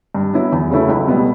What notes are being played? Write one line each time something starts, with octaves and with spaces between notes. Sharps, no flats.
G2
F#3 B3 E4
E2
C#3 F#3 A3 E4
C#2
B2 G3 B3